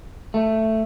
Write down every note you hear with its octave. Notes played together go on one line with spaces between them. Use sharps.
A3